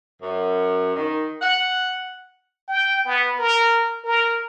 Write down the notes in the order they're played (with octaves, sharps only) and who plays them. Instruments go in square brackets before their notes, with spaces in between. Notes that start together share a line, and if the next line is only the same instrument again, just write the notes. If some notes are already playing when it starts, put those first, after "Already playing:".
[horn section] F#2
D#3
F#5
[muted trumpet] G5
B3
A#4
A#4